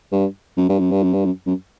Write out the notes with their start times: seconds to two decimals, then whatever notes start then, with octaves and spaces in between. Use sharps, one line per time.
0.12 G2
0.57 F#2
0.69 G2
0.79 F#2
0.91 G2
1.03 F#2
1.14 G2
1.25 F#2
1.47 F#2